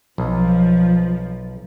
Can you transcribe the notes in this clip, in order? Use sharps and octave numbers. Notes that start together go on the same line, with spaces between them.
B1 F3